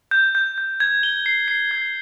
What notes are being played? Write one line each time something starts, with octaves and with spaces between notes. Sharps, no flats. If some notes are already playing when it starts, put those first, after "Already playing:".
G6
G6
G6
G#6
G7
C7
C7
G#6